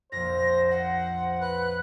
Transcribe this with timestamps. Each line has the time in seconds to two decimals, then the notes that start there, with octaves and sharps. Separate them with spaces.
0.12 A#1 F2 C5 A#6
0.71 F#5
1.41 B4 F#6